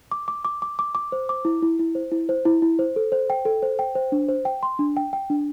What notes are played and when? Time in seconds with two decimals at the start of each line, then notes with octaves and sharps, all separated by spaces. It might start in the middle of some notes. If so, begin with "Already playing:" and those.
0.12 D6
0.28 D6
0.45 D6
0.62 D6
0.79 D6
0.95 D6
1.12 C5
1.29 D6
1.45 E4
1.62 E4
1.79 E4
1.95 C5
2.12 E4
2.29 C5
2.45 E4
2.62 E4
2.79 C5
2.96 A4
3.12 C5
3.30 G5
3.45 A4
3.62 C5
3.79 G5
3.95 C5
4.12 D4
4.29 C5
4.45 G5
4.63 C6
4.79 D4
4.97 G5
5.13 G5
5.30 D4